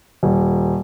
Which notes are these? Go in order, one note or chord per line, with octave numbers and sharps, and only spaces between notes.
D#1